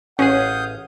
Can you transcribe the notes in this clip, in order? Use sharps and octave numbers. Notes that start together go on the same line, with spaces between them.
A1 C#4 G#4 F5 F#5 D#6 G6